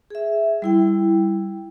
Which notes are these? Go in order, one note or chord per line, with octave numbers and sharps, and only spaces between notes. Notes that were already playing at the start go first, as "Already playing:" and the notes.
G#4 E5
G3 E4 G5